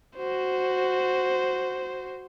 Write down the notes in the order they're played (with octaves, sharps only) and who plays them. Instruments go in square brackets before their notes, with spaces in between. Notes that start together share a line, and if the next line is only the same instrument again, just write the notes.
[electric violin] F#4 C5